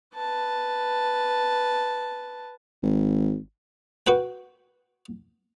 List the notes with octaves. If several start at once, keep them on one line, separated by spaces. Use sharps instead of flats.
B4 A5
G#1
F#4 B4 G5